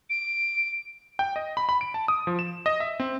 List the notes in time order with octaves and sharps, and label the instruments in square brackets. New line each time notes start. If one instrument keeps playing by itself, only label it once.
[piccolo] D7
[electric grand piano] G5
D#5
B5
B5
D7
A5
D#6
F3
E7
D#5
E5
C4